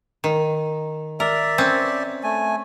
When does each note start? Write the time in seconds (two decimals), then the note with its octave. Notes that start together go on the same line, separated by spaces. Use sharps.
0.24 D#3
1.20 A#4 D5 E5
1.58 C4 C#4
2.23 A3 G#5